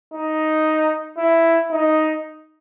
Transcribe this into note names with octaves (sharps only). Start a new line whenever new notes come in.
D#4
E4
D#4